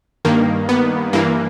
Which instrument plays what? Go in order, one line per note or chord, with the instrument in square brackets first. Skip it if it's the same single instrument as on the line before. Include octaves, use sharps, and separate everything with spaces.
[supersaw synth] G2 D#3 A#3
B3
G2 E3 A#3